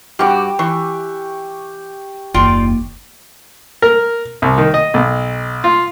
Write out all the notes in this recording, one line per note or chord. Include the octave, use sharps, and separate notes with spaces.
G2 F#4 G4 D6
E3 C#6
F#1 D#2 F4 D5 G5
A#4
C2
D#3
D#5
B1
F4